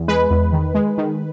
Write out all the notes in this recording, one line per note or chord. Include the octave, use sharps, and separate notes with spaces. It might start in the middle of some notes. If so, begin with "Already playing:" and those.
Already playing: E2
G#3 B4
E2
D#3
G#3
D#3